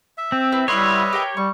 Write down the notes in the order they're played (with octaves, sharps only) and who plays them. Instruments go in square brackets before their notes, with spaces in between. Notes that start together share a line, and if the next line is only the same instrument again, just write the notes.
[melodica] E5
[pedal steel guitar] C4
[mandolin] E4 B4
[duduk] G3 [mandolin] E4 F#5 C6 [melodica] B4 D#5 E5 [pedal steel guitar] C#5
[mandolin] G4 A#4 G5
[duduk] G3 [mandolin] C#6